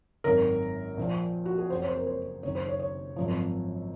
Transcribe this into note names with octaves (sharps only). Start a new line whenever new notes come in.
G#1 F#2 D#3 A#4
A#1 A#2 F3
F#4
G#4
F#1 F2 C#3 C5
C#5
C5
A#4
C5
F#1 F#2 D#3 C#5
C5
C#5
C#5
G#1 F#2 F3